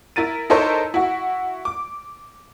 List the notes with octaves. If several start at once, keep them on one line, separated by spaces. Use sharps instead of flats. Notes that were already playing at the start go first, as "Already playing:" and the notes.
E4 A#4 A6 D#7
D#4 E4 A4 A#4 C5 C#5
E4 F#4
D6